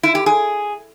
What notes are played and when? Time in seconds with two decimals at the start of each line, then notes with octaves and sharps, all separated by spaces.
0.03 E4
0.15 G4
0.26 G#4